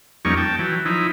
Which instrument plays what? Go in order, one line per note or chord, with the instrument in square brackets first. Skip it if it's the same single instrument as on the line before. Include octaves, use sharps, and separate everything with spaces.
[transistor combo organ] F2 G3 A#3 C#4 D#4 C#6
G5 A5
E3 F#3
F3 D#4 E4